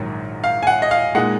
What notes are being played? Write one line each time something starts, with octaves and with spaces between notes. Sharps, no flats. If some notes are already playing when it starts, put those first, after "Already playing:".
Already playing: A#1 G#2 D#3 F#3
F5
G#5
F#5
D#5
F5
A#2 G#3 D#4 F#5